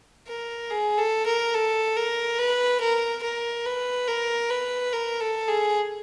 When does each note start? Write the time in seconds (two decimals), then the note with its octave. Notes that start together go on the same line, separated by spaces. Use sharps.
0.28 A#4
0.70 G#4
0.98 A4
1.26 A#4
1.54 A4
1.97 A#4
2.39 B4
2.81 A#4
3.23 A#4
3.66 B4
4.08 A#4
4.50 B4
4.93 A#4
5.21 A4
5.49 G#4